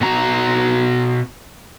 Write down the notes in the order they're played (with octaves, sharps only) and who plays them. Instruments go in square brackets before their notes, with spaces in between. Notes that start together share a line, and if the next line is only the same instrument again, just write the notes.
[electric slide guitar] B2 F#4 A#5